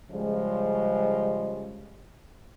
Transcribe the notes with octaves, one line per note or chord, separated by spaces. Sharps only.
C#3 F3 G3 G#3